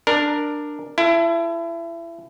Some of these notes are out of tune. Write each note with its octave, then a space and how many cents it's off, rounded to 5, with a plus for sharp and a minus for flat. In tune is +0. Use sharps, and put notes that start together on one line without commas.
D4 +10 A#4 +0
E4 +30 A4 +0